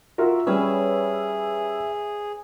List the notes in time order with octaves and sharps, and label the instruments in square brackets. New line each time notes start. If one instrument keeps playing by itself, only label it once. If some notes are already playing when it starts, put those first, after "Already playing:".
[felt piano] F4 F#4 A#4 [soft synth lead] E5
[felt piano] G3 C#4 [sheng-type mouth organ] G#4 [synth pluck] B4 C#5 E6